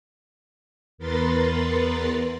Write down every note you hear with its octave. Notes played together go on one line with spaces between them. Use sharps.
E2 B3 A#4 B4 C6 A6